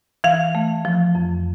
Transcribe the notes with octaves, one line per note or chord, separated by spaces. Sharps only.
E3 F5
A3
F3
F2